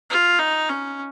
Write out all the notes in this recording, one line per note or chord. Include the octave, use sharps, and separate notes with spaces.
F4
D#4
C#4